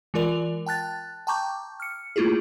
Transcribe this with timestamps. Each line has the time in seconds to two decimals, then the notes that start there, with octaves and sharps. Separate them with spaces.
0.14 E3 G#3 F4 A#4 D5 F7
0.66 G5 A5 F#6 A6
1.27 G5 A5 A#5 C#6 D6 G6
1.80 F6 C#7
2.16 A3 A#3 E4 F4 G4 G#4